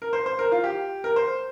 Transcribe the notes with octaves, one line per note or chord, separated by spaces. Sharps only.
A#4
C5
C5
A#4
F4
G4
A#4
C5